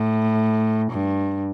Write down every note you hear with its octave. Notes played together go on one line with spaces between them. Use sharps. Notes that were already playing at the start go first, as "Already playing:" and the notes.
Already playing: A2
G2